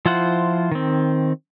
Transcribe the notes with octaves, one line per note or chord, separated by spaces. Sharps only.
F3 E4 F4 C5 F#5
D#3 C4